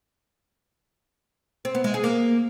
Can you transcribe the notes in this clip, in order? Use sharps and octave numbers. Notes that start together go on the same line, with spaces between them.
C4
B3
G#3
G#4
A#3